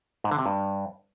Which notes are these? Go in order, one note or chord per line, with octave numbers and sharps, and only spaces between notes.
G#2
D3
C3
G2